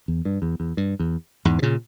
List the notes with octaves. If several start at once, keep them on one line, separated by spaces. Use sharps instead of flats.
E2
G2
E2
E2
G2
E2
E2 G#2
B2
A#2 C#3